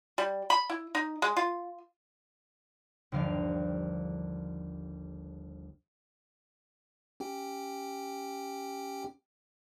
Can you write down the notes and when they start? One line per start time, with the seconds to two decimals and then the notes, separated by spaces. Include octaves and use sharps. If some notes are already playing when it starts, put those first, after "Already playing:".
0.18 G3
0.50 B5
0.70 E4
0.95 D#4
1.22 G#3
1.37 F4
3.12 G1 D#2 D3 F3 G4 F5
7.20 C#4 G4 G5